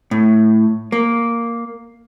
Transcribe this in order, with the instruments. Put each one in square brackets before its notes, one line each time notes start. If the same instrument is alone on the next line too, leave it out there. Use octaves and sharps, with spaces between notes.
[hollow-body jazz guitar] A2
A#3